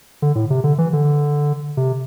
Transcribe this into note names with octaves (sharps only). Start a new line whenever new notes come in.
D3
A2
C3
D3
E3
D3
C3